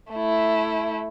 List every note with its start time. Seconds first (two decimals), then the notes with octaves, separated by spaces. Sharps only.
0.12 A3 E4